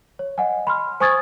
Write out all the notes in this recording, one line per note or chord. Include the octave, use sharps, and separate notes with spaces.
C#5
D#5 F#5 G#5
B5 C6 F6
C5 G#5 C#6 D#6 G#6 A6